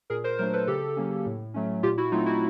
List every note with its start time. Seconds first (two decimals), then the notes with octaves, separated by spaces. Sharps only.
0.10 A#2 G#4 A#4
0.24 A#4 C5
0.39 F#3 A3 D4 A#4 C5
0.53 A4 B4
0.67 C#3 G4 A4
0.97 F#3 A#3 C#4
1.26 A2
1.54 F#3 A3 C#4
1.83 A#2 F4 G4
1.98 E4 F#4
2.12 F#3 A3 C4 D#4 F4
2.26 E4 F#4